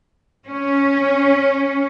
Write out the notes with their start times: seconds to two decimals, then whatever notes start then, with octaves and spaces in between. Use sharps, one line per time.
0.47 C#4